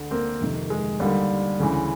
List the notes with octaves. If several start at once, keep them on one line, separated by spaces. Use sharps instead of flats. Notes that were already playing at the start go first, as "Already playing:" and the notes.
Already playing: D2 D3
A#3 C4
F2 C3 D#3
G#3
D#2 D3 G3
D2 C#3 E3